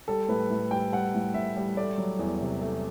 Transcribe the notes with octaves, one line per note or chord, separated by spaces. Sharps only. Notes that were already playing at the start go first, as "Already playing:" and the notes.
G3 A4
A2 B4
A2
G3 G5
G3 F#5
A2
A2 E5
G3
A3 D5
F#3
E2
C3
A3